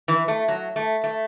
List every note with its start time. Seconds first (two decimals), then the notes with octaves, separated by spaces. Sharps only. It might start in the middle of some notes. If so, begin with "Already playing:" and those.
0.08 E3
0.28 A3
0.48 F#3
0.76 A3
1.04 A3